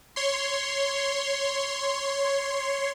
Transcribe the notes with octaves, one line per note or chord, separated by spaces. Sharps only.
C#5 C6